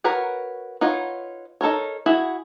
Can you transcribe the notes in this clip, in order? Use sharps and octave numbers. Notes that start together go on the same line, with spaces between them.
F#4 A#4 B4 C#5 F#5
D#4 F4 B4 C#5 F#5
D#4 A4 A#4 C#5
E4 F#4 G#4